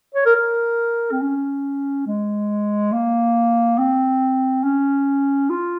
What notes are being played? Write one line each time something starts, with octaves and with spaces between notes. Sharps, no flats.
C#5
A#4
A#4
C4
C#4
G#3
A#3
C4
C#4
F4